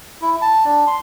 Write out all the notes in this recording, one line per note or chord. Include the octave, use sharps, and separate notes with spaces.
E4
A5
D4
C6